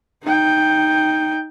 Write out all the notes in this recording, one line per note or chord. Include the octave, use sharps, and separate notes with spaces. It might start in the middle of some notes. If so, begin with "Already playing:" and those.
D#4 G5